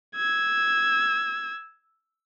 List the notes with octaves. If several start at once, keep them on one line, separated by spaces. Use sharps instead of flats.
E6 G#6